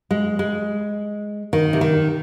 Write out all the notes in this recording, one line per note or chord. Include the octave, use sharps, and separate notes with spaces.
G#3
G#3
D#3
C3
D#3